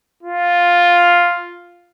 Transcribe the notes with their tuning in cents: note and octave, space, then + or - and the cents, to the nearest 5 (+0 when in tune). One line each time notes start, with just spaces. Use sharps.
F4 +5